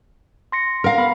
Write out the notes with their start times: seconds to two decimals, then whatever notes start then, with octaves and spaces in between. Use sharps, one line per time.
0.52 C6 A#6 C#7
0.84 A#4 F5
0.98 B3 B5